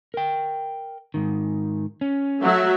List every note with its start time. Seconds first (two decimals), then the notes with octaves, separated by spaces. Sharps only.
0.14 A#4 G5
1.14 G#2 D#3
2.01 C#4
2.42 F#3 A3 E5